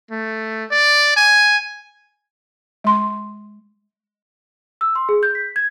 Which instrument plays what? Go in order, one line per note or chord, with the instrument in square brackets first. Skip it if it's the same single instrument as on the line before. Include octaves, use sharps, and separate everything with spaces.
[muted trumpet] A3
D5
G#5
[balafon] G#3 C6
[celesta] E6
C6
G#4
G6
B6
G#6